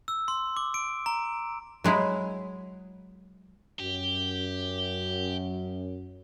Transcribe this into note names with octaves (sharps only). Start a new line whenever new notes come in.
E6
C6
D6
D7
A#5
F#3 G#3 E4
F#2 G4